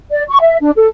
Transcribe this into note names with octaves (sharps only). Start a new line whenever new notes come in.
D5
C#6
E5
D4
A4